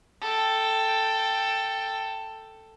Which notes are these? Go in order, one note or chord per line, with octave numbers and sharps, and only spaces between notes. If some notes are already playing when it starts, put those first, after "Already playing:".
A4 G5